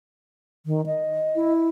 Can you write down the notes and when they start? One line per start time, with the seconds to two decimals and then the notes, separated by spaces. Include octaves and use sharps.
0.66 D#3
0.86 D#5
1.35 E4